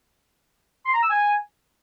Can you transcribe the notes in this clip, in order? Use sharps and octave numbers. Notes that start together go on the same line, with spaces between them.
C6
A#5
E6
G#5